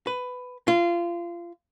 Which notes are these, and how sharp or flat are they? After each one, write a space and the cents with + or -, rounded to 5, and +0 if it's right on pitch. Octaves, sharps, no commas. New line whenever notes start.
B4 +15
F4 -25